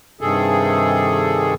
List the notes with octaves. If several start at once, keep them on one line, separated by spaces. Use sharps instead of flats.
G2 C3 D#3 G#4 A4